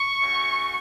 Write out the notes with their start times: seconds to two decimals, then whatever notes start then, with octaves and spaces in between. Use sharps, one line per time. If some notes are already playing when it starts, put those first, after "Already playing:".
Already playing: C#6
0.20 A3 C#4 F#4